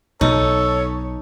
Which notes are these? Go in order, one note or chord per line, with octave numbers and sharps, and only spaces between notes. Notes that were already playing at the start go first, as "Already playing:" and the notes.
B1 B2 D#4 A4 C#5